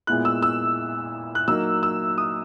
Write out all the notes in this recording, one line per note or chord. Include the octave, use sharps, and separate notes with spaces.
A#2 G#3 B3 E4 F#6
E6
E6
F#6
F#3 A#3 D#4 E6
E6
D#6